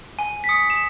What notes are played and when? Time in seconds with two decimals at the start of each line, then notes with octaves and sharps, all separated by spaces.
0.19 G#5
0.44 B6
0.49 D#6 C#7
0.70 E7